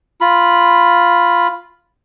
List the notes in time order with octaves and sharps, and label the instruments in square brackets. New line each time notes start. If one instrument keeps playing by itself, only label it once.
[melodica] F4 B5